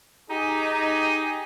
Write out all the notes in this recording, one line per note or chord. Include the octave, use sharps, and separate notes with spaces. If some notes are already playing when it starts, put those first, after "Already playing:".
D#4 G4 G#4